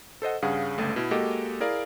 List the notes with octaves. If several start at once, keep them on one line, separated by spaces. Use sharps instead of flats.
A4 C5 D#5 F#5
G2 C#3 G#4 F5 F#5
G1 C#2 A3
B2 E4
G#3 A#3 F#4 G4 A4 D#5
E4 G#4 A#4 D5 F5